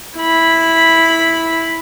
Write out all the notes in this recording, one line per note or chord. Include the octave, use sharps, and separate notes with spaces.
E4 B5